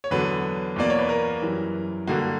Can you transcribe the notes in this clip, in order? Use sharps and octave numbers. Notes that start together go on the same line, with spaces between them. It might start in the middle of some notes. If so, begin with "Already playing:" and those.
C#5
E2 D3 F#3 B3 B4
E2 B2 A#3 D5
C#5
B4
A#4
F#2 E3 G3
G2 D3 A#3 F#4